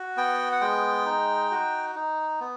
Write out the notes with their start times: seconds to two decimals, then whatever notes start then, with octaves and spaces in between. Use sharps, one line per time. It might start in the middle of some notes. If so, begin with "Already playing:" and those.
Already playing: F#4
0.17 B3 G5
0.52 F#5
0.61 G#3 G5
1.06 D#4
1.51 F#4
1.95 D#4
2.40 B3